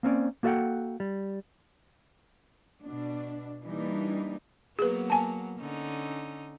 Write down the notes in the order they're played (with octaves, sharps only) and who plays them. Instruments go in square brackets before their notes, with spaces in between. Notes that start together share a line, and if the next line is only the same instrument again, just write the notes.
[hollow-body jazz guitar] A#3 C4 C#4 D5
A#3 F#4 A4 D#5 F#5 G5
G3
[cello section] B2 D4
E3 G3 A#3 D4 D#4
[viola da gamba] F#3 A#3 B3 [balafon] G#4 B4
[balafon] G#5 A5
[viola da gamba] D3 C#4 D#4